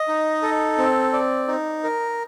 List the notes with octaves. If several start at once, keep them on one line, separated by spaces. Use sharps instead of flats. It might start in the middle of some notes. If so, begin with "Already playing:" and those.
Already playing: D#5
D#4
A4
C4
D5
D#4
A#4